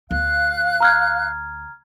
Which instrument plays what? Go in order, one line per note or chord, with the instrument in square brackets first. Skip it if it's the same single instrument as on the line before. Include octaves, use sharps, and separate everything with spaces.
[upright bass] D2 [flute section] F5 F#6
[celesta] A#5 F6 G#6